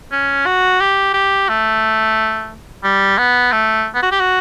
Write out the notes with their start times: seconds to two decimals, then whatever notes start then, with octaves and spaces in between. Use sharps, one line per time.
0.12 C#4
0.46 F#4
0.80 G4
1.14 G4
1.49 A3
2.84 G3
3.18 B3
3.52 A3
3.95 B3
4.02 F#4
4.11 G4
4.20 F#4